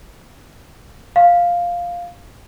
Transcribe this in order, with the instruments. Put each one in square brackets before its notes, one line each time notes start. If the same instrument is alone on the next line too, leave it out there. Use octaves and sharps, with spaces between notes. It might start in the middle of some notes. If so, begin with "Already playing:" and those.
[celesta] F5